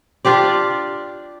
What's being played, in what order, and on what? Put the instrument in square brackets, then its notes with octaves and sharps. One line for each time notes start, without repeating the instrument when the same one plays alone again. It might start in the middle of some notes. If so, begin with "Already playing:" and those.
[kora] D4 F4 G4 D5